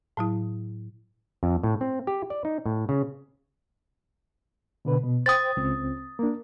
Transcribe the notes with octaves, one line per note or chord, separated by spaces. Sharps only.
A2 F#3 E4
F2
A2
C4
G4
D5
D#4
A2
C#3
B2 D3 B4
B2 B3
C5 G5 D#6 A6
C#2 C4
A#3 D4